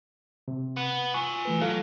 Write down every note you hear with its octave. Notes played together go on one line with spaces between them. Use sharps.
C3
B3
F4 G#5 C#6
E3 A3 B4
F#3 F4 A4 F5